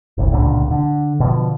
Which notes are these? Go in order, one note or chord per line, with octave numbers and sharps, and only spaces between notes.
F#1 C2
D1 C#2 A#2 D3
D3
B2 D3 F3